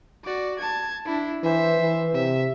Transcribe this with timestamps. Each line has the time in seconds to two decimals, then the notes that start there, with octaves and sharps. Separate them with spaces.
0.24 F#4 D5
0.59 A5 G#6
1.05 D4 E4
1.44 E3 C5 E5
1.81 E3
2.14 C3 E5